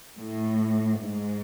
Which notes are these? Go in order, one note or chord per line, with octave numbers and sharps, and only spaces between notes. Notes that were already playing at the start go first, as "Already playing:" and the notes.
A2
G#2